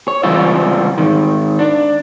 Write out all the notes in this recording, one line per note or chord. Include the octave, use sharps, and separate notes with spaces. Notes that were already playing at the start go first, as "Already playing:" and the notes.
C#5
C#2 E3 G3 C4 F4 E5
G#2 D#3
D4